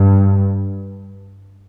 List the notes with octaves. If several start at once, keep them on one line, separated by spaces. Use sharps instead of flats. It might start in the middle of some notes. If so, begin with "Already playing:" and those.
Already playing: G2